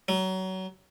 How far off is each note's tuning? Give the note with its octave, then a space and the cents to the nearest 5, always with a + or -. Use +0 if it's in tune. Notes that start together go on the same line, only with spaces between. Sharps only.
F#3 +25